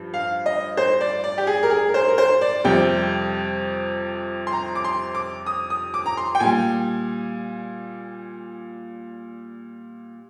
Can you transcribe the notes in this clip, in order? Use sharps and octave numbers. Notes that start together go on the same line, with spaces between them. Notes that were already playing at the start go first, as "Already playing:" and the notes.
Already playing: G2 F3
F5
D#5
C5
D5
D5
G4
G#4
A#4
G#4
A#4
C5
A#4
C5
D5
F2 C3 G3 G5
C6
A#5
D6
C6
D6
D#6
D#6
D6
A#5
C6
G5
A#2 G3 G#5